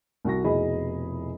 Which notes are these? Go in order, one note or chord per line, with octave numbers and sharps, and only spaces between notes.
C2 F#4 A#6
F1 B2 E4 G#4 D#5 B5